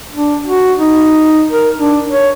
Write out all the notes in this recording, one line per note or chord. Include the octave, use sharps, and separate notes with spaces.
D4
F#4
D#4
A#4
D4
C#5